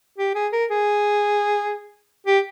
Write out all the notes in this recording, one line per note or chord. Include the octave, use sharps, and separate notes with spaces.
G4
G#4
A#4
G#4
G4